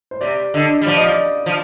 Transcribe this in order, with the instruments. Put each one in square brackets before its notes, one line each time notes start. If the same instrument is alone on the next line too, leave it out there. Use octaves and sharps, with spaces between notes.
[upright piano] C5
[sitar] C3 [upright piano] D5
[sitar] D3 [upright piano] D#5
[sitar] G3
[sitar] F3 [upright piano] D5
[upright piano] D#5
D5
[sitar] F3